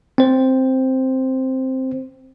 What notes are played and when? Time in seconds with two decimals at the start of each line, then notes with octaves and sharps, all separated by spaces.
0.18 C4 C5